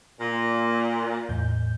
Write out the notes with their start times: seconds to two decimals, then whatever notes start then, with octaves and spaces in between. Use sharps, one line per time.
0.21 A#2
1.29 E2 A2 G6